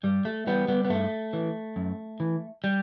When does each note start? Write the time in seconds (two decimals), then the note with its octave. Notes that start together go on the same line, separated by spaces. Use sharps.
0.03 G2 G3
0.25 A3
0.46 E3 G3 B3
0.68 G3 B3
0.85 B3
0.90 G2 A3
1.33 E3
1.76 F#2
2.20 E3
2.64 G3